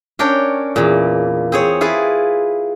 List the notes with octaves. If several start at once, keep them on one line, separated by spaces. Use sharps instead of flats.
C#4 D4 A#4 C#5 G5
E2 A#2
C4 G#4 C#5
E4 F4 G#4 B4